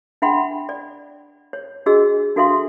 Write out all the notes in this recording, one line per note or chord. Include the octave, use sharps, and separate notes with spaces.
D4 E5 F#5 G5 B5 C6
D5
C#5
D4 F#4 G#4 D#5 E6
D4 F#4 A4 E5 F5 C6